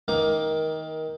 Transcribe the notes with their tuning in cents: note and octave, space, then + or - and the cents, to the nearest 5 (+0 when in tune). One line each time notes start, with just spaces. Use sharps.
D#3 +20 A#3 +15 D6 +0